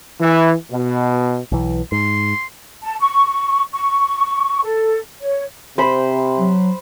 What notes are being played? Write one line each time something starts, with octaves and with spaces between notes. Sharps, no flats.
E3
B2
B1 E3
G#2 C6
A5
C#6
C#6
A4
C#5
C3 C5 B5
F#3